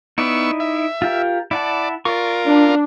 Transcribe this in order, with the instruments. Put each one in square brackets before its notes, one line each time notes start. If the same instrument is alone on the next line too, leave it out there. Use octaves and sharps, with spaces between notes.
[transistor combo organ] B3 C#6 E6 [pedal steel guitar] D#4 E4 D5
[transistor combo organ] E5
[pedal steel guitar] F4 G4 A#4
[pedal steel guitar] E4 F#5 A5 [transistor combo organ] D5
[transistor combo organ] F4 A#4 [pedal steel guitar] D5 C#6
[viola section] D4